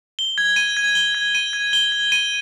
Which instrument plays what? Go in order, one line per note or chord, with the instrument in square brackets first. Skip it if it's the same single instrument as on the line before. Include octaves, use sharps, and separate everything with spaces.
[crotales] G7
G#6
D#7
G#6
G7
G#6
D#7
G#6
G7
G#6
D#7